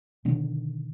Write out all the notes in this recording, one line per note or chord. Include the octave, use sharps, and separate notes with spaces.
B2 D3 D#3